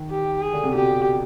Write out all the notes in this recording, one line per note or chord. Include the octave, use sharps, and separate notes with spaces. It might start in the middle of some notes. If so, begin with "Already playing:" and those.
Already playing: D#3
G4
G#4
D3
C3
B2 G4